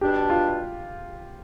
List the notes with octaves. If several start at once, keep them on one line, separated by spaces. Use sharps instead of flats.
B2 G3 D4 G4
F4